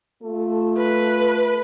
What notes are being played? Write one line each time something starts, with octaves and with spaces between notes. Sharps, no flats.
A3 F4 A4
B4